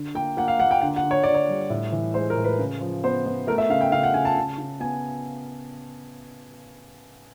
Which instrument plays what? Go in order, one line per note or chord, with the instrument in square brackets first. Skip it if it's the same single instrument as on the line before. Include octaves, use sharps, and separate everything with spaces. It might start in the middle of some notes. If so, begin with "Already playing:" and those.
Already playing: [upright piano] D3
A#3 G5
A#3 F#5
F5
A#3 F#5
G5
D3 F#5
F#5
D3
C#5
D3 D5
C#5
G3
A2
E3
G#3 C5
A#4
A2
B4
C#3
F3
B3 C5
B3
A3 A#4
E5
C#3 F5
G5
C#3 F5
F#5
C#3 G#5
A5
C#3
C#3
B3 G#5